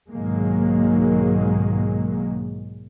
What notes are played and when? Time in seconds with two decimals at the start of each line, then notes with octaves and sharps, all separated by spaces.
0.12 B1 G#2 D#3 F#3 G#3 A#3